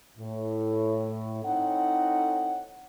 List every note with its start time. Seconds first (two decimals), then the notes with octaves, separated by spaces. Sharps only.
0.18 A2
1.44 C4 D#4 E4 A4 C#5 F#5